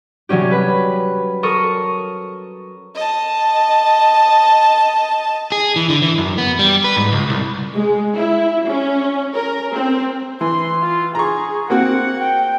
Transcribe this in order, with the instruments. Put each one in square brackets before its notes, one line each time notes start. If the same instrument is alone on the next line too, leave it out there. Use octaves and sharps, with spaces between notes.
[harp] C3 F#3 G3 C#4 G4
B4 B5
A4 A#4 C#6 D#6
[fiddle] D#5 A5
[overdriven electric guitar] G#4
E3
D3
E3
F#2
B3
G3
B4
G#2
C#2
C2
[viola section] G#3
E4
C#4
A#4
C4
[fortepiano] E3 [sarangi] C6
[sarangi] F4
[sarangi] G#4 [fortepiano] A#5 C#6
[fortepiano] A#3 C4 F#4 [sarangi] F#5
[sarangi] G5